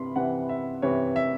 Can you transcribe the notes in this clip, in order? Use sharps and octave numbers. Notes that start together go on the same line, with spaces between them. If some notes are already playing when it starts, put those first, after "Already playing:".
Already playing: C3 E3 B5 C6
C3 E3 F#5
E5
C3 E3 C#5
E5